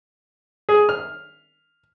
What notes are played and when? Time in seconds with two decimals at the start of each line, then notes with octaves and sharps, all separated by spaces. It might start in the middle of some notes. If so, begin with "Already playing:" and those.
0.69 G#4
0.89 F6